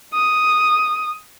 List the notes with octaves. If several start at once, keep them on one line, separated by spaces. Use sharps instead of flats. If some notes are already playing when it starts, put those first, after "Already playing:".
D#6